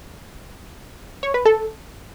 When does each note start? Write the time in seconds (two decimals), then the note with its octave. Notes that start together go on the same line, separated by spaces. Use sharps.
1.23 C#5
1.34 B4
1.45 A4